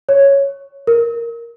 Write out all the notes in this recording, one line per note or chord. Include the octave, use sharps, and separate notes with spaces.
C#5
A#4